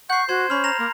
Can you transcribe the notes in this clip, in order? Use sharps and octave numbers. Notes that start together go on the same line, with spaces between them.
F#5 C#6 G6 C7
F#4 C5 C6 G#6
C#4 B5 F6
A#5 A#6 F7
A#3 A#4